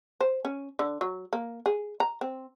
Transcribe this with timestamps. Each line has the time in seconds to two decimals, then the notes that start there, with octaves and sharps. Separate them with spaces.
0.21 C5
0.45 C#4
0.79 D3
1.01 F#3
1.33 A#3
1.66 G#4
2.00 A#5
2.21 C4